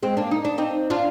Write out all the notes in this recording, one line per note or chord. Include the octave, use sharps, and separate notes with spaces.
G#3 C4
A#3 D4
D#4
D4
C4 D#4
D4 F4